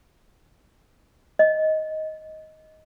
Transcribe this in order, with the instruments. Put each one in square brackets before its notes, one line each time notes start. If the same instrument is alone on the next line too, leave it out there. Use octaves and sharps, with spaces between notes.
[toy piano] D#5